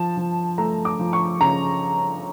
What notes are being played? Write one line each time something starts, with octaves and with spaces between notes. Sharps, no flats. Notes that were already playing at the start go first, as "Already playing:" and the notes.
Already playing: F3 A5
F3
A3 A#5
D6
F3
C#6
C#3 A#5